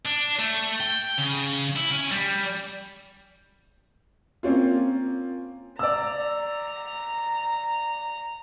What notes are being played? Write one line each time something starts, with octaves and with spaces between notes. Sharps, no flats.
D4
A3
G5
C#3
E4
C#4
G3
A#3 C4 C#4 F4
D5 A#5 E6